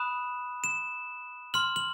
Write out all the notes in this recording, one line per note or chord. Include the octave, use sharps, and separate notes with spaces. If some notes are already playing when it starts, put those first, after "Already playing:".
Already playing: B5 D#6 F#6 E7
E7
C6 F6 F#7
F#7